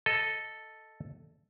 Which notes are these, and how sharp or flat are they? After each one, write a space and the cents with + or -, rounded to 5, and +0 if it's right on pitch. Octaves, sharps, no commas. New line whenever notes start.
A4 +0 D#5 +0